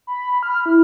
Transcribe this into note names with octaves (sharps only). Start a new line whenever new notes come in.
B5
F6
E4